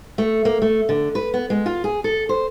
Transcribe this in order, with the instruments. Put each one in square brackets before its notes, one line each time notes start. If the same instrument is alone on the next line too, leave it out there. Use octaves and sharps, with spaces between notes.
[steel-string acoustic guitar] A3
A#3
A3
D3
B4
B3
G#3
F4
G#4
A4
C5